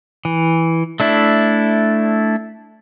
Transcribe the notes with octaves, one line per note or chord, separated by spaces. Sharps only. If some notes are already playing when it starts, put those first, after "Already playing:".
E3
A3 D4 E4